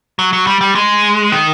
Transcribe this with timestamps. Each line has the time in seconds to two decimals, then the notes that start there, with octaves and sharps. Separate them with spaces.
0.19 F#3
0.33 F#3
0.47 G3
0.61 G3
0.75 G#3
1.32 D#3